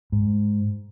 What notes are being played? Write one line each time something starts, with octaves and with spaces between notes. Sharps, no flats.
G#2